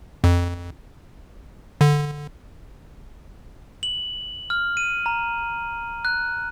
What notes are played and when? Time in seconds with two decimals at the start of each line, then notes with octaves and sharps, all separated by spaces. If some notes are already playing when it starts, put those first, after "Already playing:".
0.24 F2
1.81 D3
3.83 F#7
4.50 F6
4.77 D#7
5.06 A#5
6.05 F#6